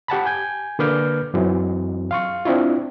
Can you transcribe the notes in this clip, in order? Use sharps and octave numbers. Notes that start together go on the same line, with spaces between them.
G4 F#5 A5 B5
G#5 G6 G#6
D3 A#3 B4 D6 F6 G6
F#2 E3 F#3 C4
F5 C6 C#6
C4 D4 E4 F4